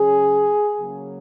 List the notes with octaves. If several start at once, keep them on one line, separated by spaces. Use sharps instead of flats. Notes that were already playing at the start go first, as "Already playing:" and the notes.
Already playing: C#3 F#3 C#4 G#4
C#3 F#3 A#3 C#4